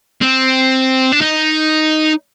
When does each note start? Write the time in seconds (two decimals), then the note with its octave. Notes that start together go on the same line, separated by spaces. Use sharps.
0.22 C4
1.12 D4
1.21 D#4